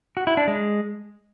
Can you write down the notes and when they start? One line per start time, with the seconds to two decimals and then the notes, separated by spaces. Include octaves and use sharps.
0.17 F#4
0.27 E4
0.37 D4
0.48 G#3